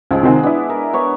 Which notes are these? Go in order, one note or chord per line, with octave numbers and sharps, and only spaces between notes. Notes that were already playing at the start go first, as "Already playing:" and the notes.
C#2 F3 G#3 G#4
C3 D#3 C4 G#4 F#5
B3 D4 E4
A#4
B3 C#5 C#6